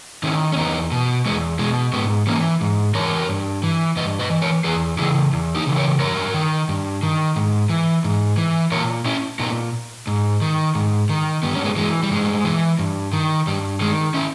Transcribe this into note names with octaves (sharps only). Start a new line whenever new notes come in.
D#3 C#4 E4
C#4
E2 B3 D#4
B2
E2 G#3 B3
B2 G#3
G#2 G#3 B3
E3 A#3 C#4
G#2
E3 A#4 C#5
G2
E3
G2 B4 D#5
B4 D#5
E3
A#4 C#5
E2 G#4 B4
C#3 E3 E4 G#4
E2
D#4 G4
C#3 E3
A#4 C#5
G2 A#4 C#5
D#3
G2
D#3
G#2
E3
G#2
E3
A#2 A#4 C#5
C#4 E4
A#2 B3 D#4
G#2
D#3
G#2
D#3
G2 B3
C#4
G#3 B3
E3 G#3
G3
G2 G#3
E3
G2
D#3
G2 G3
D#3 G#3
C#4 E4